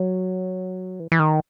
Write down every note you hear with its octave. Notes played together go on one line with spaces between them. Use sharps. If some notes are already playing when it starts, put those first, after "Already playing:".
Already playing: F#3
E3
E3
D#3